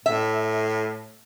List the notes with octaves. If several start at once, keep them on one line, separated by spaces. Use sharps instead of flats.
A2 E5